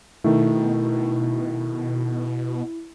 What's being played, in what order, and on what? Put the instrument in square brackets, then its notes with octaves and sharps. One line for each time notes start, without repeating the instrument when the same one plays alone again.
[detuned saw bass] B2 [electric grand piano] D#3 A3 [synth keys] E4